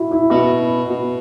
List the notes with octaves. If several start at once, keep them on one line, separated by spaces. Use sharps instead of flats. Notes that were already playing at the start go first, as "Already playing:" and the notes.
Already playing: E4 F#4
E4
B2 F#4
B2